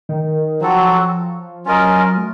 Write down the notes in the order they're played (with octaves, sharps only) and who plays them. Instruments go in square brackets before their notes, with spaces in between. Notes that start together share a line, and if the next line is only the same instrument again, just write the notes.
[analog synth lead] D#3
[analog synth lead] F3 [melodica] F#3 C4 F#4 A4
[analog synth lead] F#3 [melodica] C#4 F4 A#4 D#5
[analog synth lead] A3